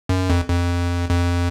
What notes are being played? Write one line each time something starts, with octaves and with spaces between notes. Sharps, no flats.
F#2
F2
F2
F2